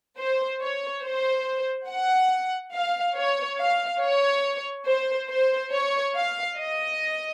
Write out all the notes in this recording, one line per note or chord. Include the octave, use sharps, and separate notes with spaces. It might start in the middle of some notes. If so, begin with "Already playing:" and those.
C5
C#5
C5
F#5
F5
C#5
F5
C#5
C5
C5
C#5
F5
D#5